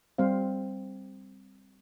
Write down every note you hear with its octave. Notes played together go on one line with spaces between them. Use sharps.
G3 C4 C5 F5